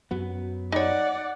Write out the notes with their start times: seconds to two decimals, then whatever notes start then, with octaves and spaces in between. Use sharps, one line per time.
0.11 F#2 F#3 B3
0.72 D#4 C#5 D5 F#5